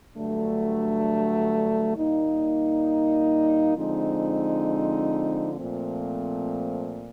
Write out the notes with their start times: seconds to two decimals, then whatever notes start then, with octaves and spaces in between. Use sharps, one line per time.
0.15 G2 D3 F#3 A3
1.95 A#2 G3 A#3 D#4
3.75 D3 F3 G#3 C4 D#4
5.54 A#2 F3 A3 C4